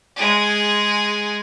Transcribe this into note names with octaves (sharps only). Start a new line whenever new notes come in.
G#3 G#4